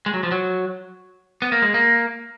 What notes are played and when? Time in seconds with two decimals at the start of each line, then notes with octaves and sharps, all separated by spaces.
0.06 G#3
0.14 F#3
0.23 F3
0.31 F#3
1.42 B3
1.52 A#3
1.62 G#3
1.74 A#3